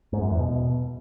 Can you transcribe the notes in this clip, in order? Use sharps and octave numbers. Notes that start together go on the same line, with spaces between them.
G#2
F#2
E2
B2